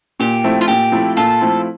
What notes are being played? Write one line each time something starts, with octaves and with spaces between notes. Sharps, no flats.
A#2 G4
F3 A3 C4 E4
F4
A#2 G4
F3 A3 C4 E4
A#2 F4 A4
F3 A3 C4 E4